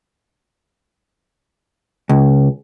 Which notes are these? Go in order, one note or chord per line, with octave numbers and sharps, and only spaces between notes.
C#2